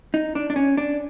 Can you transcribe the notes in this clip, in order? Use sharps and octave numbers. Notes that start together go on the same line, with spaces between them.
D#4
D4
D4
C#4
D4